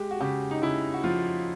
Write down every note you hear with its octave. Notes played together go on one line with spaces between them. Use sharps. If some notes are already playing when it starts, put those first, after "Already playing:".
Already playing: G#3 G4
F#4
C#3 G4
D#4
C#3 E4
F#4
F3 F4